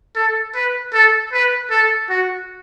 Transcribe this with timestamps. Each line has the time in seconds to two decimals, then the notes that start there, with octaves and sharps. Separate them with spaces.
0.16 A4
0.55 B4
0.93 A4
1.33 B4
1.70 A4
2.10 F#4